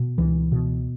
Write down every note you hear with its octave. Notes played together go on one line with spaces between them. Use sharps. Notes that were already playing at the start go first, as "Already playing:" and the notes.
Already playing: B2
C#2 E3
B2